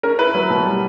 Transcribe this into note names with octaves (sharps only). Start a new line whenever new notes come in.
C#4 A#4
E4 B4
F#3
B2
G3